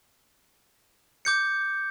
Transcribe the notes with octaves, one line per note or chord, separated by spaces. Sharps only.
D6 G6 C#7